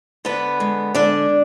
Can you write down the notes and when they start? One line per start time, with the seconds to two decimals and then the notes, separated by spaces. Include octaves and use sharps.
0.25 D3 B3 B4
0.60 G#3
0.94 D3 D4 D5